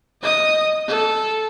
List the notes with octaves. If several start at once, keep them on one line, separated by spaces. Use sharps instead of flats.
D#5 D#6
A4